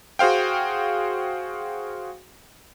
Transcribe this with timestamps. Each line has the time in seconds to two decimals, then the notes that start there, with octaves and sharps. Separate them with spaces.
0.19 F#4 G#4 C5 F5 G5